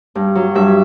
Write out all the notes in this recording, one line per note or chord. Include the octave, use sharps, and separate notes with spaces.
G2
F#3
G2 E5